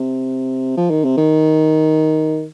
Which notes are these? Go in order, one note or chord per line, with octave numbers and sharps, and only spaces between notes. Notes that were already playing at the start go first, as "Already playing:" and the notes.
Already playing: C3
F3
D#3
C3
D#3